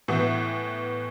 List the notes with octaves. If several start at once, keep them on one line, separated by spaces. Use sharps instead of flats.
A2 E3 B3